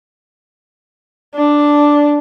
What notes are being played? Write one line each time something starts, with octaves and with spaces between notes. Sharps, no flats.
D4